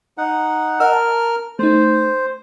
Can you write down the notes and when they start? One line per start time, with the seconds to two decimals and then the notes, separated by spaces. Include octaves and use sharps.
0.18 D#4 F#5
0.80 A#4 D#5 F#5 E6 F6
0.93 A5
1.59 A3 D#4 C5